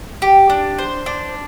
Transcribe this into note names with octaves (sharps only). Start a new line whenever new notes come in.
G4
D4
C5
D4